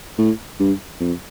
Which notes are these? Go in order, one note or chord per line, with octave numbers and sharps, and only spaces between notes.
A2
G2
F2